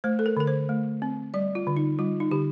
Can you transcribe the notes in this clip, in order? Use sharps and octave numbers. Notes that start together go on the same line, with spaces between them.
A3 C5
A4
A#4
D3 A#4
C5
A3
C4
G3 D5
F4
D3
D#4
G3 F4
D#4
D3 G4